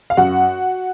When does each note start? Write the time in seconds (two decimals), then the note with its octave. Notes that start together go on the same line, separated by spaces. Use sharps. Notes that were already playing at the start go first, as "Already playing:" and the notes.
0.10 F5
0.17 F#2 F#4 F#5